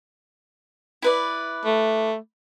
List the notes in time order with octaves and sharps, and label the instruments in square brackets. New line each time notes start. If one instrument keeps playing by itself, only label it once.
[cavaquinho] E4 B4 D5
[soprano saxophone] A3